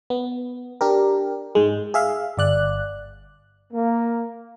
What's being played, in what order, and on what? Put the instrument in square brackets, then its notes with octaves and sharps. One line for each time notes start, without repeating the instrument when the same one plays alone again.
[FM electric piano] B3
D4 G4 A#4
G#2 G#3
G#4 E5 F5
G1 D5 F#6
[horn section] A#3